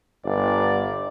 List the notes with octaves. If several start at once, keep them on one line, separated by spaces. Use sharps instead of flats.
G1 D5